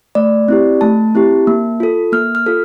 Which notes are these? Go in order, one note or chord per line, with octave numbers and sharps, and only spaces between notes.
A3 D5
C4 E4 G4
A3 A5
C4 E4 G4
A#3
F4 A4
A#3 F6
F6
F4 A4